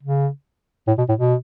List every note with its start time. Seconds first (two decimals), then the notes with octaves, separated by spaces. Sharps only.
0.03 C#3
0.87 A2
0.98 B2
1.09 A2
1.19 B2